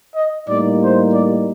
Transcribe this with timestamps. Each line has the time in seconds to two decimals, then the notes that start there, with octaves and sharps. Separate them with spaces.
0.15 D#5
0.47 A2 G3 A#3 D#4 D5
0.81 C5
1.13 D5